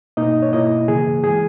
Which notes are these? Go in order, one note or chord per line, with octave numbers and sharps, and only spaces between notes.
B2 A#3 D#4 D#5
C#5
B2 A#3 E4 D#5
C#3 E3 A#3 G#4
E3 G#3 G#4